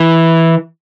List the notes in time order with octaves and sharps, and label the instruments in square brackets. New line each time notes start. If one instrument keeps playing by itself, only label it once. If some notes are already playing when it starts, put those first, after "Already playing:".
Already playing: [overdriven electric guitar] E3